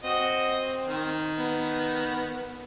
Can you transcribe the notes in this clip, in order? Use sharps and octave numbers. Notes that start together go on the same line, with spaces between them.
C4 F#4 D#5
D#3
B3